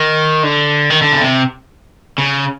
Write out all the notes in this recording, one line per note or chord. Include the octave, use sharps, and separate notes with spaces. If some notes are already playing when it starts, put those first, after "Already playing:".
Already playing: D#3
D3
D#3
D3
C#3
C3
C#3